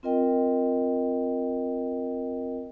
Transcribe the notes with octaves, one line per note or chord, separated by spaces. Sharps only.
C4 F4 A#4 D#5 G5